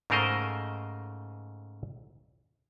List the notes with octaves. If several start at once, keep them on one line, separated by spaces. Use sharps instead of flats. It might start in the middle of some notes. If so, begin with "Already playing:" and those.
G#2 C#3 A3 A#4 C5 D#5